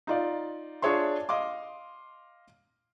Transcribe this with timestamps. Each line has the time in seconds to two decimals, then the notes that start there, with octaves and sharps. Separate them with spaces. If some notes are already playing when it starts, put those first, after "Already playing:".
0.07 D#4 F4 D5
0.82 D4 F4 G#4 C#5 E5 C6
1.29 D#5 F5 C6 D6